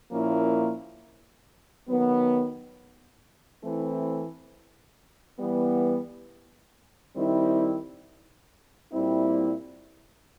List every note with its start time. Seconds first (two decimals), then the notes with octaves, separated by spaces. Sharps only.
0.11 A#2 F3 A#3 C#4 E4
1.87 D#3 F#3 B3
3.63 E3 A3 C4 E4
5.39 E3 G3 B3
7.16 D#3 G3 C4 E4
8.92 A#2 G3 C4 E4